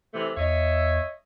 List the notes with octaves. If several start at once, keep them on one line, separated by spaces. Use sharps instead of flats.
C3 E3 A3
E2 C#5 D#5 E5